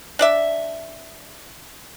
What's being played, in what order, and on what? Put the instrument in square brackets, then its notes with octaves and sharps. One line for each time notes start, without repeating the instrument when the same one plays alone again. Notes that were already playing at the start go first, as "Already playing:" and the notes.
[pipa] D4 D5 E5